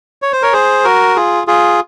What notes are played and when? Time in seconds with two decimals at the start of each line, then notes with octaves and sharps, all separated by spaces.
0.22 C#5
0.32 C5
0.42 A#4 C#5
0.53 G#4 C5
0.84 F#4 A#4
1.16 F4 G#4
1.47 F4 G#4